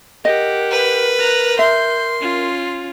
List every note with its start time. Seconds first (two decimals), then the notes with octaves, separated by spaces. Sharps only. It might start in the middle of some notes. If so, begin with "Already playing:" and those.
0.25 G4 A#4 D#5 F#5
0.71 B4
1.20 A#5 F#6
1.59 E5 C6 G6
2.21 C#4 F4